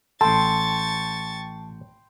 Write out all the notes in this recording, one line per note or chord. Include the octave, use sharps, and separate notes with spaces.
A1 A4 G5 A5 C6 C#6 A6